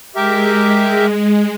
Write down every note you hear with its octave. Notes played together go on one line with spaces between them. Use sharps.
G#3 G4 A#4 E5